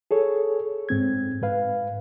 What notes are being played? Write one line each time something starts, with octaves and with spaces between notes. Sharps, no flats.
G#4 A4 C#5
G#2 C4 G#6
G#2 B4 F5